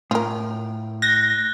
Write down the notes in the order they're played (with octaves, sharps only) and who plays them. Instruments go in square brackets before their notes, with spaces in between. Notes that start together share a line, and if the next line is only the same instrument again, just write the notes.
[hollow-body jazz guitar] A2 [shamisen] F4 A#4
[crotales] F#6 G6 A6 [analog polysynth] A#6